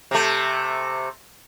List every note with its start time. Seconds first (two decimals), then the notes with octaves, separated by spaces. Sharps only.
0.11 C3 A3